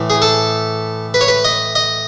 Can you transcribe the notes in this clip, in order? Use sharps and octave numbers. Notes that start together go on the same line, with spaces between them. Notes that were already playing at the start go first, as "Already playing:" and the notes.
Already playing: A2 E3 A3
G#4
A4
B4
C#5
B4
D#5
D#5